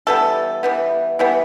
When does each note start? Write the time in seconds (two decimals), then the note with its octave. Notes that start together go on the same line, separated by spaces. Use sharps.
0.07 E3 G3 B3 A4
0.63 E3 G3 B3
1.19 E3 G3 B3